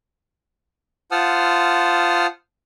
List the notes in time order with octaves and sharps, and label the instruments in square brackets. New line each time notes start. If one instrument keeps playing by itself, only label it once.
[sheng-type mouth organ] F4 C5 F#5 A5 D#6 F6